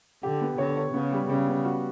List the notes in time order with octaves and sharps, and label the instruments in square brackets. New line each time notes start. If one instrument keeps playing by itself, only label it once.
[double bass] D3 [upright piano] G4
[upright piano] B3
[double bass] D3 [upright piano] C#5
[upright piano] C#5
[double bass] C#3 [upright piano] B3
[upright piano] G3
[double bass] C#3 [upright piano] G3
[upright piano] B3
F#4